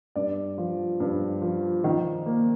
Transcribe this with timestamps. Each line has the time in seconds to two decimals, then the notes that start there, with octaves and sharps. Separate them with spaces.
0.16 G2 D5
0.58 F3
1.00 G2
1.42 F3
1.84 D#3
2.26 A#3